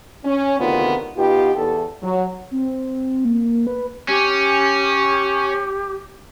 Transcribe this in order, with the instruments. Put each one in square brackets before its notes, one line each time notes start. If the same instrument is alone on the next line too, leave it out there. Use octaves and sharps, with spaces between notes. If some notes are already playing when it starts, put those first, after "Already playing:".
[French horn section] C#4
D2 C3 D#3 B3 F4 A#4
B2 B3 D#4 F4 G4
E2 A4
F#3
[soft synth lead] C4
A#3
B4
[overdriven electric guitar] C#4 [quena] G4